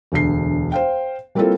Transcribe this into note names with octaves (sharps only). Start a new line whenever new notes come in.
E1 D2 C7
C5 F5 G5
G3 A#3 C4 E4 F4 A4